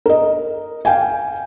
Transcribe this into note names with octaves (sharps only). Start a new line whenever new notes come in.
A#4 D#5
F5 G5 G#5